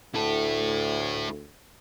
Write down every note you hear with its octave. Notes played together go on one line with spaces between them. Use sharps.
D2 E4 A4